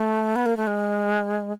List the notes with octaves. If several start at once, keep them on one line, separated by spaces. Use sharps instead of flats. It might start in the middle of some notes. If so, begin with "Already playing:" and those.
Already playing: A3
B3
A#3
A3
G#3